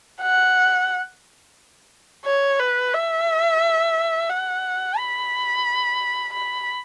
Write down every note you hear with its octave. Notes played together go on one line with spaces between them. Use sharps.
F#5
C#5
B4
E5
F#5
B5
B5